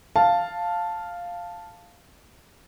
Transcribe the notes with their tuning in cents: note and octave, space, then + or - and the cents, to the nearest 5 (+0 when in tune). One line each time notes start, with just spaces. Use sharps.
F5 +0 A5 +0